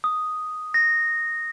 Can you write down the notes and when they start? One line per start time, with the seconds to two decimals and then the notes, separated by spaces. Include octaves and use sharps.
0.04 D#6
0.74 A#6